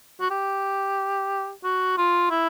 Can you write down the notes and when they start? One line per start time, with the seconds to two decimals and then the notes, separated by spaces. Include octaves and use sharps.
0.21 F#4
0.30 G4
1.64 F#4
1.98 F4
2.31 E4